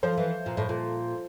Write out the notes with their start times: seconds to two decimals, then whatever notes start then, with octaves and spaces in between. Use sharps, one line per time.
0.03 F3 A4 C5
0.18 E3
0.46 A#2
0.57 A2
0.69 A#2